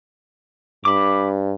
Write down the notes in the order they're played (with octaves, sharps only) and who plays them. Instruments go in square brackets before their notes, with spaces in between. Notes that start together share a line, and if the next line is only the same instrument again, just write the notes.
[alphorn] G2 [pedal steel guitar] B5 D6